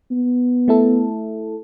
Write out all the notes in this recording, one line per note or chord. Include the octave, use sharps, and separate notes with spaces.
B3
A3 E4 A4